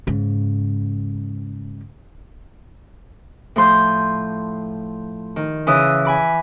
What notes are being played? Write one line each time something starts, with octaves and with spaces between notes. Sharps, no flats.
G#2 C#3
A2 F3 C6 G6
D#3
C#3 E3 D#6 E6
G#5 B5 D6